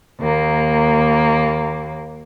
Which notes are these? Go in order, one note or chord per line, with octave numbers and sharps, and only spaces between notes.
D#2 A#3